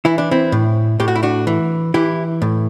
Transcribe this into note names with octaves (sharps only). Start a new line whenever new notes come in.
E3 E4
D4
C4 E4
A2
A2 G4
F#4
E4
D4 F#4
E3
E3 E4 G4
A2